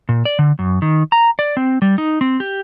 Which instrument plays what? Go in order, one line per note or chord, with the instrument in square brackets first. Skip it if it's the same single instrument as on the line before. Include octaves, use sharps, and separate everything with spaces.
[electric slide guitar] A#2
D5
D3
F#2
D#3
A#5
D5
C4
G3
D#4
C4
G4